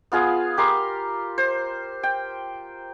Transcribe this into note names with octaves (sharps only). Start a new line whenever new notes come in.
B3 F4 G#4 F5
G4 A#4 C6
C5
G5